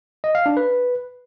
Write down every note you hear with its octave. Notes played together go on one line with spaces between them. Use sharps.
D#5
F5
D4
B4